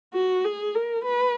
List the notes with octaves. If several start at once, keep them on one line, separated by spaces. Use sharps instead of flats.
F#4
G#4
A#4
B4